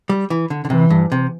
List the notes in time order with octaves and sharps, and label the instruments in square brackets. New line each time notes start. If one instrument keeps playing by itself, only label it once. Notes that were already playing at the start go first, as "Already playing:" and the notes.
[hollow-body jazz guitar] G3
E3
D3
D3
[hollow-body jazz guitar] C3 [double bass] E3
[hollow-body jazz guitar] G2
C3